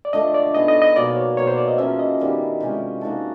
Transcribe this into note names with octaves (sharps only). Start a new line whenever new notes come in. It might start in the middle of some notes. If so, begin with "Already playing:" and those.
D5
D3 F3 A3 D4 D#5
D5
B3 D#4 G#4 D#5
D#5
D#5
B2 F#3 A#3 D5
C#5
B2 F#3 A#3 C#5
C5
D5
D#5
C#3 F3 A#3 C#4 E5
D#5
D#3 G3 B3 D4
C3 F3 G#3 C#4
A#3 D#4 F#4 A4